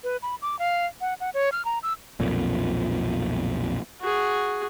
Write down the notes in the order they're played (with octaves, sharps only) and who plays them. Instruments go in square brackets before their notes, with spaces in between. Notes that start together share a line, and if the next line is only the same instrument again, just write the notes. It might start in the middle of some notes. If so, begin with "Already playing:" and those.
[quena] B4
B5
D6
F5
F#5
F#5
C#5
F6
A#5
E6
[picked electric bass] B1 F2 A#2
[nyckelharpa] F#4 G#4